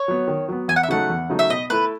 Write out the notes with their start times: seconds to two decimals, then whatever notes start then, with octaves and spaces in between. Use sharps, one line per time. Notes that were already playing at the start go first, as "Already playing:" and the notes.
Already playing: C#5
0.08 F#3 B3
0.28 D#3
0.49 F#3 B3
0.68 E2 G#5
0.76 F#5
0.83 E5
0.89 C#3 F#3 A3 D#4 F#5
1.10 E2
1.30 C#3 F#3 A3 D#4
1.39 E5
1.50 B2 D#5
1.70 A3 E4 A4 B4